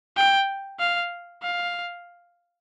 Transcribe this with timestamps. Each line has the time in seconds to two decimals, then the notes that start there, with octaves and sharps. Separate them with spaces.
0.17 G5
0.80 F5
1.43 F5